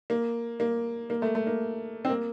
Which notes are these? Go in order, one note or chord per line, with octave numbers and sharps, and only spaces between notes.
A#3
A#3
A#3
A3
A3
A#3
C4
A#3